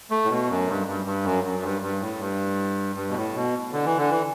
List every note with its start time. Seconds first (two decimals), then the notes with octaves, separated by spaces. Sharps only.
0.10 A3
0.25 A2
0.29 B2
0.49 F#2
0.68 G2
0.87 G2
1.05 G2
1.24 F#2
1.44 F#2
1.63 G2
1.82 G2
2.00 A2
2.19 G2
2.96 G2
3.09 B2
3.16 A2
3.35 B2
3.72 D3
3.85 E3
3.97 D3
4.10 E3